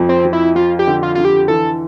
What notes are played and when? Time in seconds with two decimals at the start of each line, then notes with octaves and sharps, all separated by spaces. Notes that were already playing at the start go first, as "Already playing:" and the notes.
Already playing: F2 F3
0.09 C4
0.25 F3
0.33 E4
0.55 F3 F4
0.79 G4
0.87 D3
1.03 F4
1.15 D3 F4
1.25 G4
1.48 E3 A4